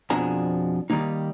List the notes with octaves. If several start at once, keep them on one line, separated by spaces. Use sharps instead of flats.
F2 B2 F3 D4 G#4 A#5
D#3 G3 G#3 A#3 D#4